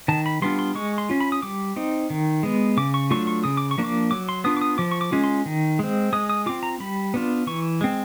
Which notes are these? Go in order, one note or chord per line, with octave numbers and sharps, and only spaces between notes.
D#3 A5
B5
G3 B3 D4 F4 C6
C6
G#3 C#6
C6
C#4 F4
B5
D#6
G3 D6
C4 D#4
D#3
G#3 B3
C#3 D6
C#6
F#3 A3 D4 F4 C#6
C#6
C#3 D#6
D6
C#6
F3 A#3 D4
D6
F#3 D6
C6
B3 D4 F4 D#6
D6
D#6
F3 D6
C#6
D6
G#3 C#4 F4
C6
D#3
G#3 C4
G#3 D#6
D#6
C4 F4 D6
A#5
G3 B5
B3 D4 F4
E3 C#6
G#3 C4